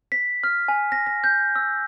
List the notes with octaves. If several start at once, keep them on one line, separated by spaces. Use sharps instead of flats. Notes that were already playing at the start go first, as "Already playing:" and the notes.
B6
F6
G#5
A#6
A#6
G6
E6